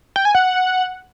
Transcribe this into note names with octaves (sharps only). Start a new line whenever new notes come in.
G5
G#5
F#5